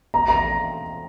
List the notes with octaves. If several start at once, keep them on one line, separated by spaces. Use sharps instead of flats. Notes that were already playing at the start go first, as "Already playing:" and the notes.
A#5
A#5